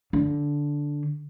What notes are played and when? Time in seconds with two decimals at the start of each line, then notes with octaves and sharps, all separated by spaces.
0.13 D3